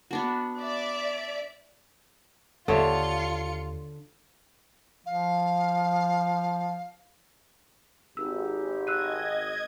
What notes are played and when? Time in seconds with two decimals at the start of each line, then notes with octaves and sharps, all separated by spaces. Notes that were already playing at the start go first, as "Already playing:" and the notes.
0.11 B3 D4 F#4
0.59 D5 E5
2.68 D#2 D3 F4 C#5 E5 C#7
5.06 F3 F5
8.17 G#1 D#4 G4 E6
8.87 D#5 E6 F#6 G#6 D#7